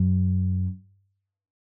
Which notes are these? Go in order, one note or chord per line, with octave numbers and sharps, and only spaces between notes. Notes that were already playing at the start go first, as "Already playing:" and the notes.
Already playing: F#2